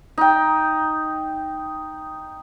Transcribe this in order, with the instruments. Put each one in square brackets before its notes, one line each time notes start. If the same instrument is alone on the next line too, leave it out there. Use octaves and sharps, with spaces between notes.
[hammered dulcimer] D#4 G5